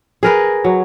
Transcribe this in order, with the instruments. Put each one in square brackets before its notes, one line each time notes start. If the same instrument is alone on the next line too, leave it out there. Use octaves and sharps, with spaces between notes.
[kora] G#4 A#4 B4
F#3